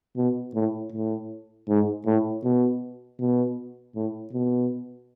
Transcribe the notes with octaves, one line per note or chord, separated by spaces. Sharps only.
B2
A2
A2
G#2
A2
B2
B2
A2
B2